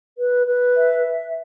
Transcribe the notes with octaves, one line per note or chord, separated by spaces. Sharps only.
B4
B4
E5